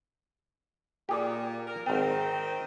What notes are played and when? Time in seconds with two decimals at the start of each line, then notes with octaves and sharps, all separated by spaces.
1.09 A#2 A#3 G4 G#4 D5
1.67 A#4
1.86 G#1 D#3 C4 G5